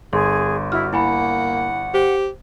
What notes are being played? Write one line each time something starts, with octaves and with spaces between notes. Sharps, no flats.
G1 G#4 C6
E4 F#4 F6
A#3 E4 F#5 G#5 B5
G4 C5